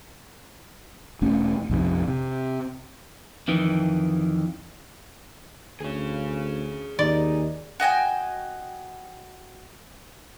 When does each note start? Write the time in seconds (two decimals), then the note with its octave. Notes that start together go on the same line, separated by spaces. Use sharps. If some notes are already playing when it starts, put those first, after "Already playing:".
1.22 E1 A3 C#4
1.69 A#1 F2 C3
2.08 C3
3.48 F2 D#3 E3
5.80 D2 G#4 C#5
6.99 D#2 D#4 D5
7.80 F#4 D#5 G5 G#5